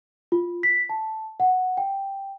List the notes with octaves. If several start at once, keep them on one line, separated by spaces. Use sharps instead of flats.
F4
B6
A5
F#5
G5